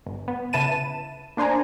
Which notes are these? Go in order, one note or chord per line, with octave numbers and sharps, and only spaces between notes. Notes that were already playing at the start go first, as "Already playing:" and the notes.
G1
B3
C#3 E4 B4 A5 D#7 E7
A#3 D4 C5 G#5 A#5